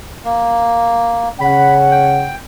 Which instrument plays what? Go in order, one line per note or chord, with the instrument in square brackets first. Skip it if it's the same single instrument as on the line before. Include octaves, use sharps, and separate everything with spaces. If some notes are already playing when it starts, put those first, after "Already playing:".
[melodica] A#3
[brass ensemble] C#3 C#4 F#5 [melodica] B5
[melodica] G5